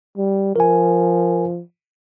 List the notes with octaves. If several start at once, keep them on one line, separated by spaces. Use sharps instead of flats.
G3
F3 A#4 G#5